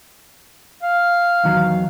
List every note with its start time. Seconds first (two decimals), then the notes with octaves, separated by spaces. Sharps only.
0.83 F5
1.44 E2 D#3 F#3